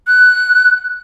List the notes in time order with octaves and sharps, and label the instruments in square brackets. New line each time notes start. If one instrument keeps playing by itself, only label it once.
[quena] F#6